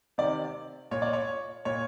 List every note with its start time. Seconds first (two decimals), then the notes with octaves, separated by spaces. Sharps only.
0.18 C3 D#3 D5
0.91 A#2 C#5
1.02 D5
1.13 C#5
1.65 A#2 C#5